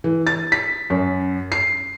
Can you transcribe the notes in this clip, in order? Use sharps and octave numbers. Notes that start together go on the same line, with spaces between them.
E3
A6
B6
F#2
C7